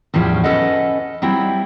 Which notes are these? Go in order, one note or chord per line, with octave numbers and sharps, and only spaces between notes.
E2 A2 F3 G3 C#4 G4
C#4 A4 B4 D#5 F#5
F#3 G3 C4 E4